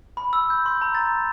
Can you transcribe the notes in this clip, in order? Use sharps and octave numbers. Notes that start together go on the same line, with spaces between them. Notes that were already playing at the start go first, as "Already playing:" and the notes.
B5
E6
G6
C6
A#5
A6